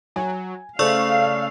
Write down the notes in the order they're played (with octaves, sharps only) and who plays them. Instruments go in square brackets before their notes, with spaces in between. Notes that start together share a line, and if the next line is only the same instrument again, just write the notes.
[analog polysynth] F#3 [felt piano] G#5
[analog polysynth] C#3 A3 [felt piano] A4 C5 [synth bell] D5 C#6 E6 [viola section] F5